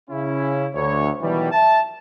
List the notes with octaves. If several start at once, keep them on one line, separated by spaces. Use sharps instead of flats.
C#3 C#4 E4
D2 C#5
B2 D#3 E3 F#3 G3
E5 A5